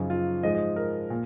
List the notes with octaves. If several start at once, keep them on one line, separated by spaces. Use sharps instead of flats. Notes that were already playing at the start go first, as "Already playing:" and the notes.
Already playing: F#2 C#3 F3 D#4
F4
G#2 F3 G#3 D#5
D#5
A#4
A#2